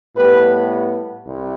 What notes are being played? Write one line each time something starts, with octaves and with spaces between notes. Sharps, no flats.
A2 G3 B3 G4 B4
C2